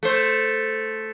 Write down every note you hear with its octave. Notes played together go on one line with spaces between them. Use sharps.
A3 C5